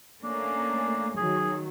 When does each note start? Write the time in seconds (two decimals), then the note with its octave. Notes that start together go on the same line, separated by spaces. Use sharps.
0.24 A3 A#3 C#4 D4
1.17 D#3 F#3 G#4